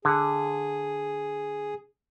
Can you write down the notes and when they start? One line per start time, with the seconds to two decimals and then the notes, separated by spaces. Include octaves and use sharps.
0.05 D3 G#4